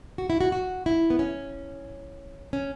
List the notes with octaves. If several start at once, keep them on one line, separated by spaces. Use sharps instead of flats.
F#4
E4
F#4
F#4
E4
B3
C#4
C#4